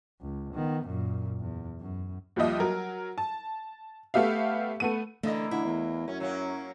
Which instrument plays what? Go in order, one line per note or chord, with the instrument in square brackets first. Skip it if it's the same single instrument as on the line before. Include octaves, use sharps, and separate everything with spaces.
[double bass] C#2
D#3 B3
F#2 A#2
E2
F#2
[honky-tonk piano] D#2 F3 G3 G4 D#5 E5
F#3 A#4
A5
A3 B3 G4 E5 F5
A3 B3 D#7
[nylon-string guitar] D3 [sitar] E3 A#3 D#5 [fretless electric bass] A3
[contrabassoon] D3 [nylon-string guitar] E4
[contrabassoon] E2
[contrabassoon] F#2 [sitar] C#4
[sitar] F#3 A#3 C#4